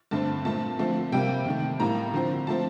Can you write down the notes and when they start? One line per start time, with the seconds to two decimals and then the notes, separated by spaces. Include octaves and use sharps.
0.11 G2 D3 A3 C4 A5
0.45 A#2 A3 C4 A5
0.79 D3 F3 A3 C4
1.12 C3 G3 A#3 G5
1.46 C3 D#3 A3
1.80 A2 G3 A#3 A#5
2.14 D3 F3 C4
2.47 F3 A3 C4 A5